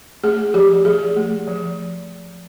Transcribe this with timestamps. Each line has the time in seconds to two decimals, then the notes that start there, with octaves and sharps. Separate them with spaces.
0.24 A3 G#4
0.54 F3 G4
0.85 F3 G#4
1.16 A3
1.48 F3